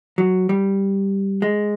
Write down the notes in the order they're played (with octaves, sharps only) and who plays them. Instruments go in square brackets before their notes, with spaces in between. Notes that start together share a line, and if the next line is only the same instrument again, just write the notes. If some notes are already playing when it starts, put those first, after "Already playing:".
[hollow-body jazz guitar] F#3
G3
G#3